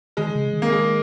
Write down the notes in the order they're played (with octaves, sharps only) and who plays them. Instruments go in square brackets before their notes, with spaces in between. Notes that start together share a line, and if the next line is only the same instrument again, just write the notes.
[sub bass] D#3 [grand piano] G#3
[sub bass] C#3
D#3
[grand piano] A#3
G#3